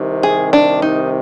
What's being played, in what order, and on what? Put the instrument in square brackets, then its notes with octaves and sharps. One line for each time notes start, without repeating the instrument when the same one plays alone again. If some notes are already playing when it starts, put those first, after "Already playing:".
Already playing: [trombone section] C2 C3 D#3
[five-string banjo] G#4
D4
D#4